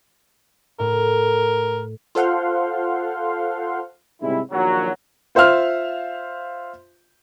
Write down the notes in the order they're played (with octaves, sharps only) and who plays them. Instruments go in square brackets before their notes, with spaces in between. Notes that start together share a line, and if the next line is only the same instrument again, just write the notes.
[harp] A2 [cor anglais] A#4
[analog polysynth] F4 A4 C5 F5 F#5 C6
[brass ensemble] G#2 C3 G3 G#3 E4
A#1 D#2 A#2 F3 F#3
[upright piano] F4 C5 E5 F5 F6